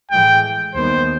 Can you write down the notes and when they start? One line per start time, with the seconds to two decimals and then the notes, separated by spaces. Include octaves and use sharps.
0.11 A2 E3 G#3 G5
0.75 D#2 D#3 G3 B3 C5